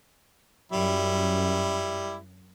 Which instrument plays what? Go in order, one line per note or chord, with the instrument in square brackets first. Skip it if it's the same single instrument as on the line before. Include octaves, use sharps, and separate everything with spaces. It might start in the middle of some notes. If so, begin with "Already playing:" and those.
[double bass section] F#2 [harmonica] G3 E4